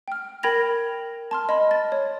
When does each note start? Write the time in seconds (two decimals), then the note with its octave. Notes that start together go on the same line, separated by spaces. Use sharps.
0.08 G5 F6
0.43 A#4 G5 B5 G#6 A#6 F7
1.31 A5 C6 F6
1.49 D#5 B5 C6
1.71 A6
1.92 C#5